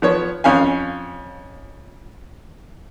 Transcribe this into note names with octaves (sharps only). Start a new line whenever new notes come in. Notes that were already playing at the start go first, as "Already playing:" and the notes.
F3 B3 C#5
F2 C#4 F5 G#5